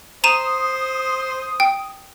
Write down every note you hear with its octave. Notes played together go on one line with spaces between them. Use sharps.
C5 A#5 D#6 D#7 E7
G5